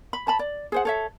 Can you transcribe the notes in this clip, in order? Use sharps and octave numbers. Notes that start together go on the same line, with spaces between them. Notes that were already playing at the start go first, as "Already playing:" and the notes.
B5
C5 A5 B5
D5
G#4 C5 F#5
A4 C#5 E5